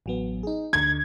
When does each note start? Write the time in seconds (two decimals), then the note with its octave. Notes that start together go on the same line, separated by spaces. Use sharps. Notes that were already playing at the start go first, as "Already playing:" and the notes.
0.06 A1 F#3 B3
0.43 D#4 G#4
0.73 D2 D3 G#6